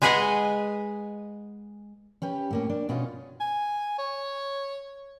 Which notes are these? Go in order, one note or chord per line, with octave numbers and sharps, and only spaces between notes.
G#3 G#4 B4 D#5 F#5 G#5
C#4 G4 B4
A2 A#3 C#4
D4
B2 C#4 D#4 F4
G#5
C#5